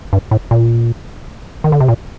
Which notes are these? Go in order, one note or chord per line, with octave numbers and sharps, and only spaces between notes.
G2
A2
A#2
D#3
D3
C3
A#2